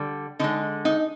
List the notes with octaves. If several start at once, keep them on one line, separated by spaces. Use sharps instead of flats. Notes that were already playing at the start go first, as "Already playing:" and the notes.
Already playing: D3 G3
D3 G#3 D#4
D#4